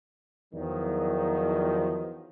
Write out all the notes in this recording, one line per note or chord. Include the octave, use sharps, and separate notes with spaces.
E2 D#3 F3 F#3